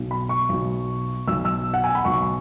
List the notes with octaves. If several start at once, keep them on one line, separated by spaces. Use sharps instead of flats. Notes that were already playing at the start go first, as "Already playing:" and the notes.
Already playing: B1 B2
B5
C#6
B1 B2
B1 B2 E6
E6
F#5
G#5
B5
B1 B2 C#6